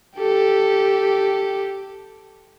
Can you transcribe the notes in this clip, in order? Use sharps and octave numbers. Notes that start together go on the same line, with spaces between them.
G4 A4